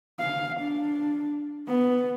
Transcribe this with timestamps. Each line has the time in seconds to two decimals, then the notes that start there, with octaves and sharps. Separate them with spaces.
0.19 F5
0.60 D4
1.68 B3